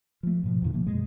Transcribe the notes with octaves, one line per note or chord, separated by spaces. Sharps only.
F3 A3
G#2 B2 F3
E2 A#2 D3
C3 F3 A#3
F#2 B2 G#3